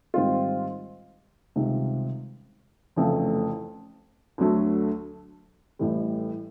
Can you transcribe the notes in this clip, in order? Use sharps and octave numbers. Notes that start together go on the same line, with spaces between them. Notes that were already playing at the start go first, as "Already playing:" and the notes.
G#2 D#3 G3 C4 F4
C#2 C3 D#3 G3
F1 F2 C#3 E3 A3
D2 D3 F#3 A3
A1 A2 E3 G3